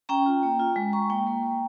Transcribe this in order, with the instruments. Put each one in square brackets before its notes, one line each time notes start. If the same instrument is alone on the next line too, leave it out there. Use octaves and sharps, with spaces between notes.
[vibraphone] C#4 G5 A#5
F4
A#3
F4
G#3
G#3 A#5 C#6
A#3 G5 A#5
A#3
A#3